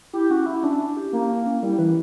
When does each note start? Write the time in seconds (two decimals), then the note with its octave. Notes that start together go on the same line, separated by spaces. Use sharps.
0.13 E4 G4
0.30 C#4 F#4
0.46 C#4 E4
0.63 C#4 D4
0.79 C#4
0.97 G4
1.13 A#3 C#4
1.30 C#4
1.46 C#4
1.62 G3 E4
1.78 E3 B4